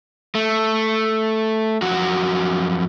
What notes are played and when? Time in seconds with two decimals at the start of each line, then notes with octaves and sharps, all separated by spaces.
0.35 A3
1.82 F2 F#3 F#4